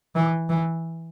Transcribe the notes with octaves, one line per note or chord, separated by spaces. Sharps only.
E3
E3